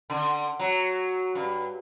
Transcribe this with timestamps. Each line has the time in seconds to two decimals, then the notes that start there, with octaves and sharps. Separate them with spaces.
0.10 D3
0.59 F#3
1.35 G2